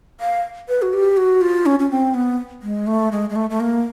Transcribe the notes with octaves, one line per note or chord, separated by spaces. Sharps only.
F5
B4
F#4
G4
F#4
F4
C#4
C#4
C4
B3
G#3
A3
G#3
G#3
A3
A3
A#3